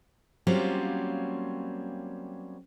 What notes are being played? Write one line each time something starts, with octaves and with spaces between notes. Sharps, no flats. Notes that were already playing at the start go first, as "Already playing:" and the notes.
F#3 G3 A#3 C4 C#4 F4